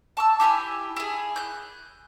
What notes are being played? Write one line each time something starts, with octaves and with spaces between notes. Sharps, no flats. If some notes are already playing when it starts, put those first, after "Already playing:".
A5 C#6 E6
E4 G4 G#5 E6
E4 G#4
F#6 G6